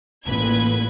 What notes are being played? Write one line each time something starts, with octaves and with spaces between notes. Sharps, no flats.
A1 A#2 B4 G#6